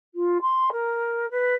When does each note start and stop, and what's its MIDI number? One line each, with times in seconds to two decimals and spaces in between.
0.14 0.37 65
0.41 0.70 84
0.72 1.29 70
1.31 1.54 71